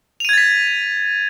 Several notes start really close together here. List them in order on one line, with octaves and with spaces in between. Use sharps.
F7 D#7 G#6 A6 B6